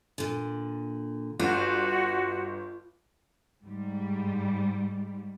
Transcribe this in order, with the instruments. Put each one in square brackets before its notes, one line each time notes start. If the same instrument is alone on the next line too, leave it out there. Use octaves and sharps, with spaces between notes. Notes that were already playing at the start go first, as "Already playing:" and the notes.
[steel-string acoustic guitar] A#2 D3
[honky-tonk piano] G1 [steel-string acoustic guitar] F4 [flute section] F#4
[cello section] G#2 G3